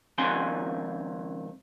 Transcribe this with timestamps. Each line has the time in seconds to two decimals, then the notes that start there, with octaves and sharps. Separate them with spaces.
0.18 C#2 D#3 F3 C4 G#5 C6